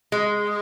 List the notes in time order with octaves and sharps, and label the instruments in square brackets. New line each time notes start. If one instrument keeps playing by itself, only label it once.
[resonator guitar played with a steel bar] G#3